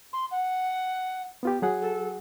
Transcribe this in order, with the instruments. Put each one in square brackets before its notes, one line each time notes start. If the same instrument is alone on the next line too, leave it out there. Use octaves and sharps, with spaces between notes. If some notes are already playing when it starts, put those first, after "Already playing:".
[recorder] C6
F#5
[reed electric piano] B3 F4 G4
F#3 G#4 F#5
[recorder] A4